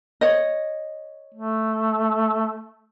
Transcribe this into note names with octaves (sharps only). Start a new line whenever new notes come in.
C#5 D#5
A3